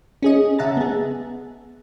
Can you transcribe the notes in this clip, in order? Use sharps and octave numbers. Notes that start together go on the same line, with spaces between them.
C#4 G#4 D#5
C#3 E5 F#5 A5 A#5 A6
B3 G#4